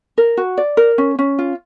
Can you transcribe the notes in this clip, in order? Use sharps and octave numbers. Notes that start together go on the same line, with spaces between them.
A#4
F#4
D5
A#4
C#4
C#4
F4